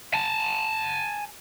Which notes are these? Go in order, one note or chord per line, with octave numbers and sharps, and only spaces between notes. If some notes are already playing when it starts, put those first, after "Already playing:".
G#5 A5